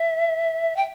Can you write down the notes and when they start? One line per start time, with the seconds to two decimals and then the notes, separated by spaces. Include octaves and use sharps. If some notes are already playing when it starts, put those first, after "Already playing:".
Already playing: E5
0.76 G5